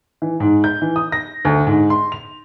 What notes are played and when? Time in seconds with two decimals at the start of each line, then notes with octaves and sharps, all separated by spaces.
0.22 E3
0.40 G#2
0.64 G6
0.82 E3
0.96 D#6
1.12 A#6
1.45 D2
1.67 G#2
1.90 C6
2.12 F7